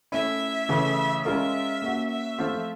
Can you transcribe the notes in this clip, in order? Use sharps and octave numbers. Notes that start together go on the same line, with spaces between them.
A3 C#4 E4 E5
C#3 E3 A3
G#3 C#4 F4 A#4 E5
A#3 C#4 F#4
E5
F3 A3 C4 F4